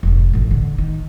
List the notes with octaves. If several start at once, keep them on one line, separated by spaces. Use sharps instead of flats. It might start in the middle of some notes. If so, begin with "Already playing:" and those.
F1 G#2
A1 F#2
D3
D#3